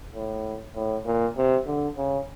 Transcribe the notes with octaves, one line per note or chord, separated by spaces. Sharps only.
A2
A2
A#2
C3
D3
C#3